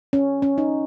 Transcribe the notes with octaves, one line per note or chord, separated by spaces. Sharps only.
C#4
C#4
D#4